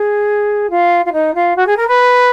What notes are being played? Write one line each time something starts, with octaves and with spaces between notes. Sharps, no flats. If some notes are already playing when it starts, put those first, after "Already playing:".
Already playing: G#4
F4
F4
D#4
F4
F#4
G#4
A#4
B4